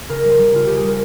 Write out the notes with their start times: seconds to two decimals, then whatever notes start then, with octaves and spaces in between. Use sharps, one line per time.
0.09 C#3 A#4
0.24 G3
0.31 C5
0.39 G3
0.54 C#3 F4
0.66 C#3 G4
0.76 G#4
0.83 G3 A#4